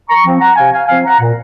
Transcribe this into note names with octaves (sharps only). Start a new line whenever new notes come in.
A#5 C#6
F3 C4
F#5 A#5
C3 F5 G#5
F5 G#5
F3 C4 F5 G#5
F#5 A#5
A#2